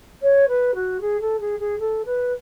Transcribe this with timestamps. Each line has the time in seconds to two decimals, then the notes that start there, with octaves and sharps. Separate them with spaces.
0.22 C#5
0.48 B4
0.74 F#4
1.01 G#4
1.20 A4
1.40 G#4
1.59 G#4
1.79 A4
2.05 B4